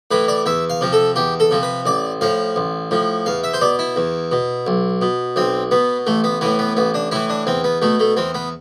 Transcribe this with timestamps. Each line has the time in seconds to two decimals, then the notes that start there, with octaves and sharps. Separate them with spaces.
0.11 A2 E3 B4
0.28 D5
0.46 E2 E5
0.70 F5
0.81 C3 F3
0.93 A4
1.16 E2 G4
1.40 A4
1.51 C3 F3
1.63 B4
1.86 A1 D5
2.21 A2 F3 F5
2.56 A1
2.91 A2 F3
3.26 E2 F5
3.44 E5
3.53 C5
3.61 B2 D5
3.79 E4
3.96 E2
4.32 B2
4.67 B1
5.02 B2
5.36 B1 C4
5.71 B2 B3
6.07 A1 A3
6.24 B3
6.41 A2 E3 B3
6.59 B3
6.77 A1 B3
6.94 D4
7.11 A2 E3 E4
7.30 D4
7.47 E2 C4
7.64 B3
7.82 B2 A3
8.00 A3
8.17 E2 C4
8.35 B3